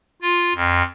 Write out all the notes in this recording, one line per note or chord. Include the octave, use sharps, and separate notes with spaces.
F4
F2